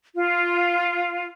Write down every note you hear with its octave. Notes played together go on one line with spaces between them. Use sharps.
F4